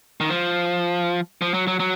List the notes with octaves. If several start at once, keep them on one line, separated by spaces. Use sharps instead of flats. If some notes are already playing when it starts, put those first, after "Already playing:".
D#3
F3
F3
F#3
F#3
F#3